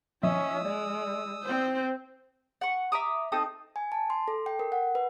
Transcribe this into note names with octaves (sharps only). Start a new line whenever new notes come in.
F3 C#4 D#5 E5 D#6 E6
G#3 D5
C4 C5
F#5 C#6
E5 A#5 D6 D#6
C4 D#4 A4 D#6
G#5
A5
C6
A4
G5
A#4
F#5
B4